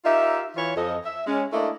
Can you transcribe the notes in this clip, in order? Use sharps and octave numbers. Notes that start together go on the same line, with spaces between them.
D#4 F4 G4 A#4 E5
E3 F4 B4 C#5
F2 F3 A4 D#5
E5
G#3 C#4
A3 A#3 D4 E4 A#4 D#5